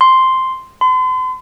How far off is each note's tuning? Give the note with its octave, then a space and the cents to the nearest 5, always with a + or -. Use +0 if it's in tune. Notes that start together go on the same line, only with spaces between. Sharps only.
C6 +0
C6 -40